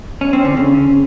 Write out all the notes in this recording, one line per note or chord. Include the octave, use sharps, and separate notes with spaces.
C#4
C4
D3
C#3